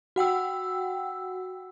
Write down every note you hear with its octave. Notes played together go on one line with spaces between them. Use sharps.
F#4 F#5 G5 E6